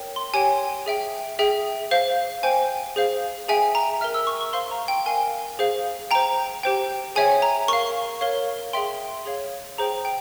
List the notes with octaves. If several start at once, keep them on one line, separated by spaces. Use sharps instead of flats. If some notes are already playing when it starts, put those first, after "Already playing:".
Already playing: A#4 C#5 G5
C6
G4 C#5 G5 G#5
G#4 E5 G5
G#4 E5 G5
C5 F5
C5 G5 G#5
G#4 C5 F5
G#4 E5 G5 G#5
A#5
A#4 E5 G5 F6
E6
C#6
C#6
C5 F5 C6
A#5
G5
A#4 F5 G#5
G#4 C5 F5
C5 G5 A#5
G4 C5 G5
G#4 C#5 E5 G5 G#5
A#5
A#4 F5 C#6
A#4 C#5 F5
G#4 E5 G5 C6
G#4 C#5 F5
G#4 C5 G5 A#5
G5